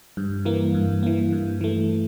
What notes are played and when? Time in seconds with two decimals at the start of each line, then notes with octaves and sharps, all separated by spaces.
0.17 G2
0.45 E3 A#3
0.74 G2
1.03 E3 A#3
1.32 G2
1.61 E3 A3